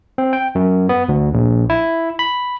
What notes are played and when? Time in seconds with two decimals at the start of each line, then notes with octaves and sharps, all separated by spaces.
0.18 C4
0.33 G5
0.55 F#2
0.89 B3
1.09 D2
1.34 A#1
1.70 E4
2.19 B5